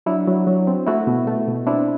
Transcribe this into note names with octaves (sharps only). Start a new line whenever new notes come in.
F#3 D4 E4
F#3
F#3
C4
A3 E4 F#4
B2
A3
B2
C4 D4 E4